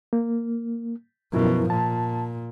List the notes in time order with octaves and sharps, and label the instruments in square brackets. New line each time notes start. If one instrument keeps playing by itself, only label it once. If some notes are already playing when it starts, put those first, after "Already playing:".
[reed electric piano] A#3
[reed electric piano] F#2 E4 A#4 [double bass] B2 F3
[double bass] A#2 [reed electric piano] A5